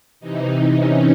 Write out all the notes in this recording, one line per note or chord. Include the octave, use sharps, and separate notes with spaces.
C3 E3 D#4
C#4